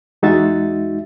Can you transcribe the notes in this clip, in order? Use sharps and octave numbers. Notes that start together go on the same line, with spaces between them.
E2 G#3 D#4 F#4 E5 A6